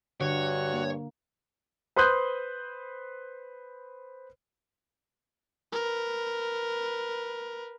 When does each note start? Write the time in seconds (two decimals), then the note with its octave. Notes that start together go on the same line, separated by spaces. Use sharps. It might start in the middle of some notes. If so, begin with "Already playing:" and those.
0.21 G2 D3 F#4 C#5
0.74 A#3
1.96 B4 C5 C6 D#6 F#6 G6
5.72 A#4 B4